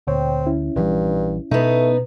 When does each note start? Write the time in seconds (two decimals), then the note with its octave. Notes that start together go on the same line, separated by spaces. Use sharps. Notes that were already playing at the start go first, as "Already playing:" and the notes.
0.07 D2 A#2 C4 C#5 G5
0.47 C#4 E4
0.76 A#1 G2 E3 G3
1.51 B2 A3 B3 D#4